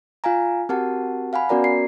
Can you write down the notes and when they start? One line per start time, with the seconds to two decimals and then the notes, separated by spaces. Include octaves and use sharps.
0.24 F4 F5 G#5 A#5
0.69 C4 F#4 G4 A#4 F#5 A5
1.33 F5 F#5 G#5 B5
1.49 B3 C#4 F#4 A#4 D5 A#5
1.64 C7